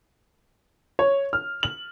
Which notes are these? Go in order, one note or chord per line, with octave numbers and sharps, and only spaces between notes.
C#5
F6
F#7